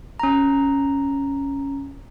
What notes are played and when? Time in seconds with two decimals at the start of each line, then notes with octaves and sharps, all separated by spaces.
0.20 C#4 A#5